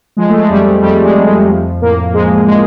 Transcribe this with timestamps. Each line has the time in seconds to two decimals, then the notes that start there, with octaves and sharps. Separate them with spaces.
0.17 F3 G#3
0.30 A3
0.39 G#3
0.50 F2 G3
0.83 F2 G3
1.05 G#3
1.15 F2
1.26 G#3
1.48 F3
1.82 A2 A#3
2.14 F3 G#3
2.48 F3 G#3